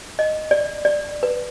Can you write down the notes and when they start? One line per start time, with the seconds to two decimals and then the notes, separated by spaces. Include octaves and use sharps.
0.19 D#5
0.51 D5
0.85 D5
1.23 B4